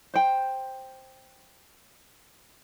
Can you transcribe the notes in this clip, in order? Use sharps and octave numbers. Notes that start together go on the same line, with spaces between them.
C5 G5